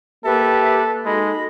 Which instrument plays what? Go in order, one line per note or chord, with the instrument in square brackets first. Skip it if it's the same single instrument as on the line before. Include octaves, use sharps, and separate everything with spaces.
[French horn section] A#3 [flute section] G4 B4 E5 [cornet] A4
[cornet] G#3 [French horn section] D#4 F#4 A4 [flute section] D#5 B5